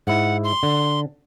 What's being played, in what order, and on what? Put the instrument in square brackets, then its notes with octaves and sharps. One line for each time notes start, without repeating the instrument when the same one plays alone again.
[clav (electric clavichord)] G#2 E4 [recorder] F#5
[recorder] C6
[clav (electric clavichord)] D3